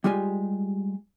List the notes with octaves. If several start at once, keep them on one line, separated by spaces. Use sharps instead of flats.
G3 G#3 F4 G4 G#5